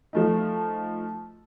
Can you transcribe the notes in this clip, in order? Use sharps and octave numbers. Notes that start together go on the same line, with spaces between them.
F3 A3 D#4